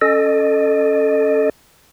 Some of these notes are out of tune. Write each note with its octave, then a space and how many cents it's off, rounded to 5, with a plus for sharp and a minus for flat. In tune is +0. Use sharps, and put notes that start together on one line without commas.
C#4 +0 A4 +0 D#5 -25